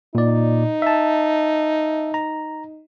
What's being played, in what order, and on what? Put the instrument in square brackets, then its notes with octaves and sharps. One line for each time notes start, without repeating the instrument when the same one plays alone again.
[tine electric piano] A#2 D5 [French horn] D#4
[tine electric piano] E5 A5
A#5